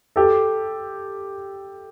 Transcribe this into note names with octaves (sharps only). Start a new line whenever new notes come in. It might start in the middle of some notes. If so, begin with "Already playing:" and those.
G4 A4